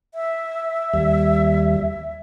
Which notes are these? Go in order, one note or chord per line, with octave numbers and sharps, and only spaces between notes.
E5
D#2 G3